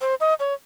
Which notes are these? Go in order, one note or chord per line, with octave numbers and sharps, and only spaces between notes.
C5
D#5
C#5